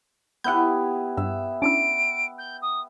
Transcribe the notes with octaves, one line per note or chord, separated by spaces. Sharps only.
B3 E4 G4 F#5 G6
G2 E5
C#4 D4 E4 D7
G6
D#6